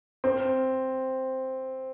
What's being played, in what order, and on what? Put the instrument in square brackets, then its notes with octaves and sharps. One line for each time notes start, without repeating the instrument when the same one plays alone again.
[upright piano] C4